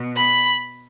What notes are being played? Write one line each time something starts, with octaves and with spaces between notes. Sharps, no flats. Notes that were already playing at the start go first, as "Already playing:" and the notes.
Already playing: B2
B5